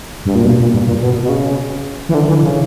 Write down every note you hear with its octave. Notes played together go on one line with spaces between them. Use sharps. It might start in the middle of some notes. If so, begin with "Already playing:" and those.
G2
A#2
B2
A#2
G2
A#2
B2
B2
C#3
E3
D3
E3
C#3